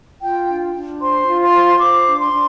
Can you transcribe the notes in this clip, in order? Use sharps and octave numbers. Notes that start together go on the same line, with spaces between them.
F4 G5
D4
D4
C5 C6
F4
C6
C5
C5 D6
D4
C6
D4